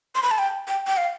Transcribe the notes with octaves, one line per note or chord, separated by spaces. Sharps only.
C6
B5
A5
G5
G5
G5
F5